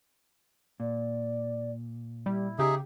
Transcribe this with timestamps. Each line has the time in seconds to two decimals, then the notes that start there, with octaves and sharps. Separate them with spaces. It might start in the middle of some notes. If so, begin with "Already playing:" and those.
0.80 A#2 D5
2.26 G3 E4
2.59 C#3 D#4 G4 G#4 E5